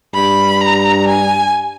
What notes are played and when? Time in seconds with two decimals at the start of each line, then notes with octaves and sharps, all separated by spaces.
0.14 G2 B5
0.61 A#5
1.08 G#5